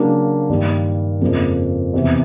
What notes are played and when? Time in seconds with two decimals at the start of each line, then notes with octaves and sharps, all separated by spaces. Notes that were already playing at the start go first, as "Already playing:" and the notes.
Already playing: C#3 F#3 A#3 D4
0.49 G2 D#3 G3 A#3
1.21 F2 C#3 F3 A#3
1.93 E2 C3 E3